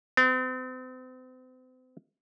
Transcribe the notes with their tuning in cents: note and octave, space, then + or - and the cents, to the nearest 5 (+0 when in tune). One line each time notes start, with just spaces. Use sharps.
C4 -40